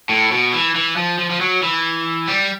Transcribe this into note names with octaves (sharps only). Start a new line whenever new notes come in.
A2
B2
E3
E3
F3
F3
F3
F#3
E3
G3